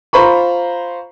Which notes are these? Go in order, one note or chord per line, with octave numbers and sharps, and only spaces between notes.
F4 C5 A#5 B5 C#6